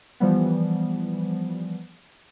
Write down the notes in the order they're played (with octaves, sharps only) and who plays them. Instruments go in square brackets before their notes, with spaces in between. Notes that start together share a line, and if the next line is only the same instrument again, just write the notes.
[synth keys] E3 F3 G3 B3